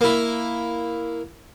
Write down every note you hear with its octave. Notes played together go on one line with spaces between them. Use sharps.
A#3 E4